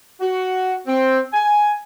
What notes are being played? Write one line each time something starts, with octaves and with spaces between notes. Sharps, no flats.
F#4
C4
G#5